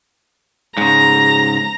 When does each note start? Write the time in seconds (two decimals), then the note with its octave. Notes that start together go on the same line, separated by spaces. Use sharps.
0.77 G#2 C#3 A#5